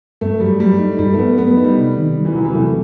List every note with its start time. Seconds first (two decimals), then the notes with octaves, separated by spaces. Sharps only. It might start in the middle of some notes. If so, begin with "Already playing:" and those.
0.21 G2 A3
0.40 F#3 G3
0.60 G3 A3
0.79 D#4
0.98 G2 G3
1.13 A3
1.19 F#3 B3
1.38 A3 B3
1.57 D#4
1.64 G3
1.77 C3
1.96 D#3
2.15 G3
2.25 E3
2.35 C3 F#3
2.45 E3
2.55 C3 A3